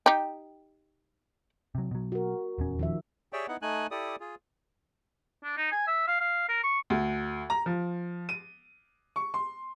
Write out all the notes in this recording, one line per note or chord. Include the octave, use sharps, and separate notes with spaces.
D#4 G4
C3 F#3
B2 F#3
F#4 A#4
D#1 E2 C#4
D#3 F3 E5
G4 G#4 C#5 D5 E5 G5
B3 D#4 E4 F#5
A3 D#4 G#5 F#6
E4 G4 A4 D5 D#6
F4 G#4
D4
D#4
G#5
E5
F5
F5
A#4
C#6
D2
A#5
F3
D#7
C#6
C6